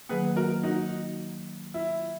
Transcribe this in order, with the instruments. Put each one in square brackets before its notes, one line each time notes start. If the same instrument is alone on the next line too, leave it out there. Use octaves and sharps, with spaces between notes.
[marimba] D#3 F#3 A#3 [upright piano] G#4 B4
[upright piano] F#4 A#4
D#4 F#4
E4